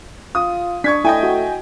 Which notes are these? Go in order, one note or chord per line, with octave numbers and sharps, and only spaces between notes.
F4 D#6
D4 C#6 G#6 B6
A3 E4 D#5 G5 G#5
F#4